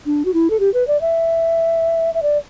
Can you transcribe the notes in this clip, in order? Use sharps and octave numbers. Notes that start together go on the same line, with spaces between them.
D4
F#4
E4
A4
G4
B4
D5
E5
E5
D5